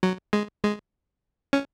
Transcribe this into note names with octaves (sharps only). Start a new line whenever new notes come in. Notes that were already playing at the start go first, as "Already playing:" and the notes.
F#3
G#3
G#3
C#4